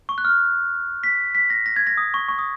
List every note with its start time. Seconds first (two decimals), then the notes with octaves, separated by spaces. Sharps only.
0.09 C#6
0.18 F#6
0.25 F6
1.04 B6
1.35 B6
1.50 A#6
1.66 A#6
1.76 G#6
1.87 A#6
1.98 D#6
2.14 C#6
2.29 C#6
2.39 D#6